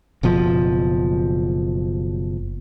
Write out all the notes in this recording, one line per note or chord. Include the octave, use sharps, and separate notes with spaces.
F#1 B2 F3